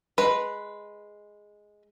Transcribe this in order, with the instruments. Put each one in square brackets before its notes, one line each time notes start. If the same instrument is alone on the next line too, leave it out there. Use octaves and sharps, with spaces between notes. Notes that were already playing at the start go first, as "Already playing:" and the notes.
[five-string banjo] G#3 B4